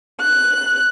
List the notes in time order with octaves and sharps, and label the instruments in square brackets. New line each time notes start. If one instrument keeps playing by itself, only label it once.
[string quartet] F#6